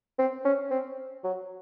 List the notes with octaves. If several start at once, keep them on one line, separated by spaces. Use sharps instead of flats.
C4
C#4
C4
F#3